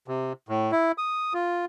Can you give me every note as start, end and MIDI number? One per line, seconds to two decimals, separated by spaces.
0.08 0.33 48
0.49 0.72 45
0.72 0.92 64
0.98 1.33 87
1.34 1.65 65